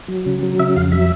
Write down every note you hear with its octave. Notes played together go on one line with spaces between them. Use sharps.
F#3
C#3
F#3
C#3 E5
F2 F5
F#3 E5